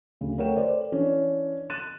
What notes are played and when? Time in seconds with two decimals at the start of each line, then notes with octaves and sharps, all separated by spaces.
0.21 D2 C#3
0.38 A3 A#4 C#5 F#5 G5 E7
0.57 A4 B4 C5 D5
0.92 E3 C#4 D4 C#5
1.70 F#6 A6 D#7 E7